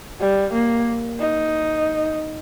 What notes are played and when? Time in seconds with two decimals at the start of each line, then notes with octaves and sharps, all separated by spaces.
0.21 G3
0.53 A#3
1.20 D#4